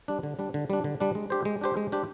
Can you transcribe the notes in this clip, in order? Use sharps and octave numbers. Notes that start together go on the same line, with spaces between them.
G3 D4
D3
G3 D4
D3
G3 D4
D3
G3 D4
G#3
D4 G4 C5
G#3
D4 G4 C5
G#3
D4 G4 C5